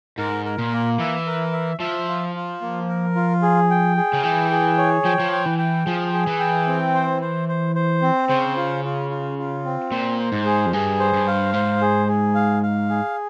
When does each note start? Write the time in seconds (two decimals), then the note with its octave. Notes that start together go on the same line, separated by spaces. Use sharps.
0.18 G#2 A#4
0.45 A#4
0.58 A#2
0.72 A#3
0.99 E3 E5
1.27 A#4
1.53 E5
1.80 F3 E5
2.08 F4
2.35 F4
2.61 A#3
2.89 A#4
3.15 F4
3.42 G#4
3.70 G5
3.97 G#4
4.13 C#3
4.23 E3 G5
4.50 G#4
4.78 C#5
5.05 F3 G5
5.20 F3
5.32 G5
5.46 E3
5.59 G5
5.85 F3 G#4
6.13 G#4
6.27 E3
6.40 G5
6.67 C4
6.94 C5
7.22 C5
7.48 C5
7.75 C5
8.02 C4
8.29 C#3 C5
8.57 F4
8.84 F4
9.10 F4
9.38 F4
9.65 C4
9.91 A#2 C5
10.18 C5
10.32 G#2
10.45 G#4
10.66 F2
10.73 G2 G#4
10.99 C5
11.14 G2
11.28 F5
11.54 G#2 C5
11.81 G#4
12.08 G#4
12.35 F5
12.63 F5
12.89 G#4